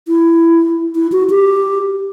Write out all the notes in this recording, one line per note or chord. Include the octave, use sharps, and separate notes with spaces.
E4
E4
F#4
G4